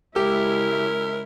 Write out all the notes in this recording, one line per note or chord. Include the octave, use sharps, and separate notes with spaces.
C#3 G#3 E4 G4 A#4